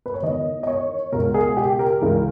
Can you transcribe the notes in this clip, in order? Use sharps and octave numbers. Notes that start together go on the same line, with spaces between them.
B4
C#5
E2 D#3 D#5
D#5
C#5
C#2 B2 A#4
G#4
G4
A#4
C#2 C#3 E3